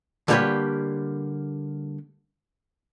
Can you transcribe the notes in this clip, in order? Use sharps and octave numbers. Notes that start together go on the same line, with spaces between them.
D3 G3 A#3 G4 B4 C#5